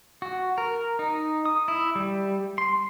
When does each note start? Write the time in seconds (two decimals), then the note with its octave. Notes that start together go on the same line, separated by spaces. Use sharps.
0.22 F#4
0.58 A#4
0.99 D#4
1.45 D#6
1.68 E4
1.96 G3
2.58 C6